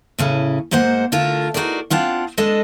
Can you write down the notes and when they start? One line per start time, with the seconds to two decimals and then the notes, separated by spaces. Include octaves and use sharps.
0.19 A2 C#3 C#4
0.71 G#2 G#3 A#3 C5 F#5
1.12 D3 A3 F4 A#4
1.54 D#4 F#4 G#4 A#4 D5
1.90 C4 D4 F4 F#5
2.38 G#3 D4 A4 D#5